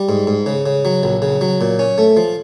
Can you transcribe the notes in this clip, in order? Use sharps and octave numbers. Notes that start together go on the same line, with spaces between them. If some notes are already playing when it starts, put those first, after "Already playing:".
Already playing: G3
G#2
G#2
C#3
C#3
F#3
A#1
C#3
F#3
A#2
C#4
A3
F3